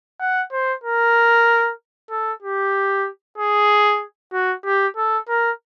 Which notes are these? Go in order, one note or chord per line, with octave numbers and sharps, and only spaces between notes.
F#5
C5
A#4
A4
G4
G#4
F#4
G4
A4
A#4